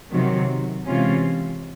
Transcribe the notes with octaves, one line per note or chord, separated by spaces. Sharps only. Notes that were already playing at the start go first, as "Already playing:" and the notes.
C3 D#3 F#3
C3 E3 G#3 C#4 F4